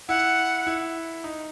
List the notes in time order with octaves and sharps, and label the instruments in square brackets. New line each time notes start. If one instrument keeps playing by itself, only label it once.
[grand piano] E4 [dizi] F#5
[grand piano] E4
D#4